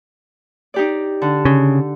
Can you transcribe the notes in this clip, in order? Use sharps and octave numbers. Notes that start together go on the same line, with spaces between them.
D#4 G4 D5
D3
C#3